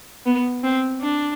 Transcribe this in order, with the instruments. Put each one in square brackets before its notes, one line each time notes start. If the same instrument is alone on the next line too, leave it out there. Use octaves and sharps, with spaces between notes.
[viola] B3
C4
D4